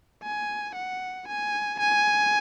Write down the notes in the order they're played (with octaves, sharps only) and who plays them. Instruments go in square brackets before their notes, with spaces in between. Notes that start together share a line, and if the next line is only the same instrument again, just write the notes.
[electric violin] G#5
F#5
G#5
G#5